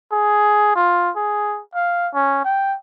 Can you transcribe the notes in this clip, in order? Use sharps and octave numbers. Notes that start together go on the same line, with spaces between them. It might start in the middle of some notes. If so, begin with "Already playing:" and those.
G#4
F4
G#4
F5
C#4
G5